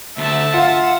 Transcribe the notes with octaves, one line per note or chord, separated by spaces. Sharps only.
D2 E5 A5
F4 F5 F#5